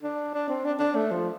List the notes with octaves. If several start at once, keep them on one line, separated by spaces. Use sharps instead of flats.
D4
D4
C4
D4
D4
A3
F3